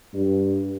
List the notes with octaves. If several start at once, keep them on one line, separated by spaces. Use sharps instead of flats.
G2